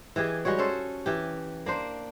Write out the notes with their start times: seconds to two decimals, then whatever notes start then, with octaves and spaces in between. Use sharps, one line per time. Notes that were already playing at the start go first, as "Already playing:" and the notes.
0.16 E3 G4 G#4 D#5
0.45 G3 G#3 F#4 C#5
0.58 C#4 A4 C5
1.06 E3 G4
1.66 A#3 D4 C5